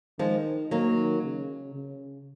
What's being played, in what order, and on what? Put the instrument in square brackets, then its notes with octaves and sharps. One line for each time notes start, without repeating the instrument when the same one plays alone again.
[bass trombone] D#3 [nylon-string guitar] F3 G#3
[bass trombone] D#3 [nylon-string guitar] F#3 A#3
[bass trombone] C#3
C#3